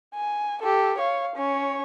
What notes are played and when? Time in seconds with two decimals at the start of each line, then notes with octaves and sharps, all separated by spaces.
0.14 G#5
0.62 G4 A4
0.98 C#5 F5
1.36 C#4 C#5